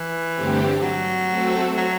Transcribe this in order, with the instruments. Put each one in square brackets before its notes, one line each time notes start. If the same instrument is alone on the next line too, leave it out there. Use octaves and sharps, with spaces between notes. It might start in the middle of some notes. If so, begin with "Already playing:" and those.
Already playing: [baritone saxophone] E3
[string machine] G2 D3 A3 C4 G4
[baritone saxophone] F#3
[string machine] A3 C4 F#4 A4
[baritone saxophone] F#3